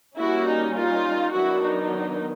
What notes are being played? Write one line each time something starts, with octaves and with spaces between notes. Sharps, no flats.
G3 A#3 C#4 E4 F#4
D#4
D#4 F4
D#3 F#3 B3 D4 E4 F#4
D#4